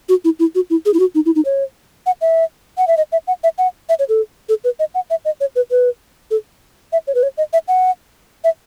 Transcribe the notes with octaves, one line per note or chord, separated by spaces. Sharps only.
F#4
E4
E4
F#4
E4
G#4
E4
F#4
D#4
E4
D#4
C#5
F#5
E5
F#5
E5
D#5
E5
F#5
E5
F#5
E5
C#5
A4
A4
B4
D#5
F#5
E5
D#5
C#5
B4
B4
A4
E5
C#5
B4
C#5
D#5
E5
F#5
E5